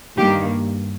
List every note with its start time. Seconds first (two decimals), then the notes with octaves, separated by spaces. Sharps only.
0.17 G2 D#3 A#3 G4